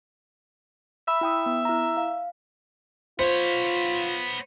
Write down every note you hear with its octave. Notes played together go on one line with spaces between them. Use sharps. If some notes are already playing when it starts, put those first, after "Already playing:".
E5 B5 E6
E4 G5 D#6
B3
E4 A#5
F5
B3 F4 C5 C#5